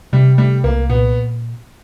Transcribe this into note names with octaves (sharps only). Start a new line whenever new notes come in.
C3 G3
G3 A3
C2 A#3
A#2 B3